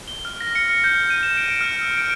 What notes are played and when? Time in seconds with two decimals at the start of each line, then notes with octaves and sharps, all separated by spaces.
0.08 G7
0.25 F6
0.41 A#6
0.55 C#7
0.68 F6
0.84 G6
1.10 D#7
1.23 E7
1.37 D7
1.61 F6
1.81 E6
1.97 D7